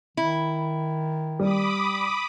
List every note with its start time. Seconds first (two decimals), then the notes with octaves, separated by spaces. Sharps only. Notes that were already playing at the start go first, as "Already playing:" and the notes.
0.17 D#3 E4
1.40 G3 B5 D6 D#6